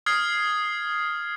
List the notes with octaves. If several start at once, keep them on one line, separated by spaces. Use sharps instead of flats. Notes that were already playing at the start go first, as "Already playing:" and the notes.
D#6 F6 G#6 C7